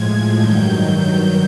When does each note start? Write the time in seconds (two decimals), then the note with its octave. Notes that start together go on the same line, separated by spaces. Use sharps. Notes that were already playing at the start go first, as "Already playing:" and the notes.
Already playing: A2 F3 G#3 G#6
0.38 G2 D#3 F#3 G6